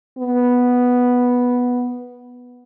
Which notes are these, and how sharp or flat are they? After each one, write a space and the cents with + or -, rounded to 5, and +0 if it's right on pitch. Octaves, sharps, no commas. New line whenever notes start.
B3 -5